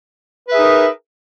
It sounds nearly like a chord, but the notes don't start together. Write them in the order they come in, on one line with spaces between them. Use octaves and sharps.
B4 E5 G#4 D#4 A#4